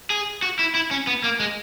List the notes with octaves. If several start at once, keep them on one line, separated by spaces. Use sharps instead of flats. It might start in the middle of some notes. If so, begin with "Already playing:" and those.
G#4
F#4
E4
E4
C#4
B3
A#3
G#3